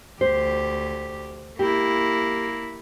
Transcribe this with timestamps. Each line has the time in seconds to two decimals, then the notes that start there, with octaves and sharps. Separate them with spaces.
0.21 D2 G4 C5
1.59 A#3 E4 G4